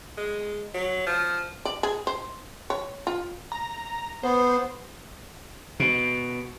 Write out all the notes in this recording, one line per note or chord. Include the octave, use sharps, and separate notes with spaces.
G#3
F#3
F3
D5
G#4
C5
C#5
F4
A#5
B3 C5
B2